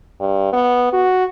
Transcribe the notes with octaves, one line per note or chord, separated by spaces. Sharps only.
G2
B3
F#4